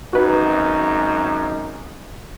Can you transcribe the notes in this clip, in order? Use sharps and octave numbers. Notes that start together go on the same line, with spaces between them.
G#1 F#2 D#4 F#4 B4